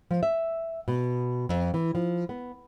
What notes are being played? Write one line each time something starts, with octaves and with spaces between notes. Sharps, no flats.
F3
E5
B2
F2
E3
F3
B3